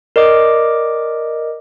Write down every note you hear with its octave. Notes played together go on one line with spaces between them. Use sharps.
A#4 D5 D#5 D6